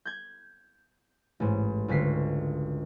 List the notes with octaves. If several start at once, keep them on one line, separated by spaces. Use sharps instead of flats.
G6 G#6
A1 G#2
G#1 C#2 D3 B6 C7